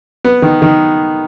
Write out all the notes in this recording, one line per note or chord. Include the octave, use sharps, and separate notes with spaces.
B3
D#3
D#3